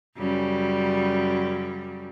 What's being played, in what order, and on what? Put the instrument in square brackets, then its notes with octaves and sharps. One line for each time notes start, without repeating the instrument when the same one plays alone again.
[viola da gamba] F#2 C#3 G3